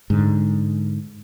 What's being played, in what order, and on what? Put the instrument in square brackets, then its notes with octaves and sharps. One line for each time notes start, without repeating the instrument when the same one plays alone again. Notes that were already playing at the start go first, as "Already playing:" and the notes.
[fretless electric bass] G#2 D3